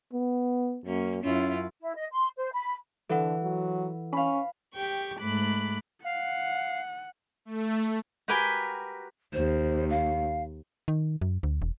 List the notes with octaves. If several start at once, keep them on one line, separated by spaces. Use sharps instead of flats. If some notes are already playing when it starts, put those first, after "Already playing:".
B3
F#2 A#3 C#4
F#2 C#4 E4 F4
E4
D#5
C6
C5
B5
D3 E3 A4 F#5
F#3
C#4 F5 B5
G4 G5 C#6
G#2 A3 B5 D6 F#6
F5 F#5
A3
F#4 G4 A#4 B4 G5 G#5
D#2 C5
F5
D#3
F#2
D2
E1